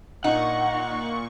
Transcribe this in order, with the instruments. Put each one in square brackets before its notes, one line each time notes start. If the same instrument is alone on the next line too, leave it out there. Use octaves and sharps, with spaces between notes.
[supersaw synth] A#2 C#6 [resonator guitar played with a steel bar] D#4 [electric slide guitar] F#5